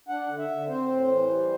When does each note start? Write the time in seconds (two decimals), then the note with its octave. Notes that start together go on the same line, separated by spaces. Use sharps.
0.09 D4 F#5
0.28 D3
0.38 E5
0.48 D3
0.67 C4 C5
0.88 A2
1.08 E3
1.28 G3